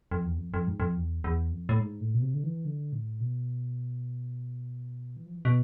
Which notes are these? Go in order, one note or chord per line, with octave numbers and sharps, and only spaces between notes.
F2
E2
F2
F2
G#2
F2
E2
E2
F2
A2
G#2
A2
B2
C3
D3
E3
D3
A2
B2
E3
F3
E3
B2